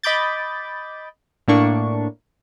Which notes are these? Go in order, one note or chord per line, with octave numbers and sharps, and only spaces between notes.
D#5 B5 D6 G6 A6
A2 A#3 D4 C#6